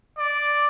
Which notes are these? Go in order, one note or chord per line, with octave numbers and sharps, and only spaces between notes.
D5